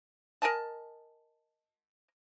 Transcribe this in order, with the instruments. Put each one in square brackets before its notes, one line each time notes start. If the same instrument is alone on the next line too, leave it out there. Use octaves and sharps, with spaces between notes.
[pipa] A#4 D#5 G#5 A5